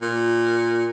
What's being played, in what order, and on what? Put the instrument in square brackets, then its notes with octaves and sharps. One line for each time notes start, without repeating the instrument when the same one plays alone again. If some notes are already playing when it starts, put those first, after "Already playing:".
[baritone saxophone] A#2